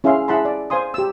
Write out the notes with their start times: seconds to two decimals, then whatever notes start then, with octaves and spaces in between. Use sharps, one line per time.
0.04 C#4 E4 G#4 E5 F5 C6
0.28 E4 G#4 F#5 A5 B5 C6
0.45 D5
0.70 C5 F5 G#5 C6 D#6
0.94 G4 E6